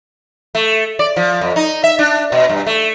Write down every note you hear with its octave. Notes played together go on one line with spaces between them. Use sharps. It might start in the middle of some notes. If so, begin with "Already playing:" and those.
A3
D5
F3
F2
D#4
E5
D4
B2
G2
A3